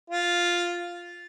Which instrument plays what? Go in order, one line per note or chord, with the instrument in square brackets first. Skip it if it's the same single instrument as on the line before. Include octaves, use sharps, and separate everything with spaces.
[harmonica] F4